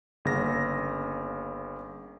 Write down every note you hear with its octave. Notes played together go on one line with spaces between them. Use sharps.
G1 C#3 A#3 A#6